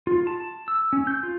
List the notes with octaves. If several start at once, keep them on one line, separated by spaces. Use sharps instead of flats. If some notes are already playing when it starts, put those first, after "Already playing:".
F4
A5
E6
C#4
G6
F4